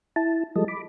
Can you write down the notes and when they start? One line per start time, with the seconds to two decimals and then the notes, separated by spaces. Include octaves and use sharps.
0.16 E4 A5
0.56 F3 G3 G#3 A4 D#5
0.68 B5 D6